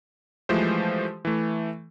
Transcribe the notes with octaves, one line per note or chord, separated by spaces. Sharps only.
E3 F3 G#3 A3 G4 C5
E3 A3